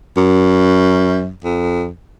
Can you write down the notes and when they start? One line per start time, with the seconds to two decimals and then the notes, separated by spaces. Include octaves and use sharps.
0.17 F#2
1.44 F2